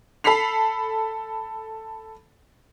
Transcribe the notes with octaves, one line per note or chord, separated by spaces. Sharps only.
A4 B5 B6 C7 F7